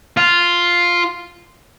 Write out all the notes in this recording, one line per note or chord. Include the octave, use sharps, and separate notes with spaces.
F4